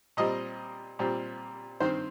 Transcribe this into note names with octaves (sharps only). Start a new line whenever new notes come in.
A#2 G3 C4 D#5
A#2 G3 C4
G2 D#3 C4 C5